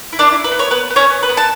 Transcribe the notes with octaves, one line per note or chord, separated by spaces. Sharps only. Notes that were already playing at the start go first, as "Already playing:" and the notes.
E4
D4 D5
E4
B4
B3
C#5
B3 B4
B3
C#4 C#5
B3
B4
B3
A5